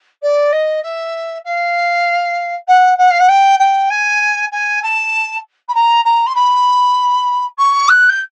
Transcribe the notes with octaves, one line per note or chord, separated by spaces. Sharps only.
D5
D#5
E5
F5
F#5
F#5
F5
F#5
G5
G5
G#5
G#5
A5
B5
A#5
A#5
C6
B5
C#6
F#6
G6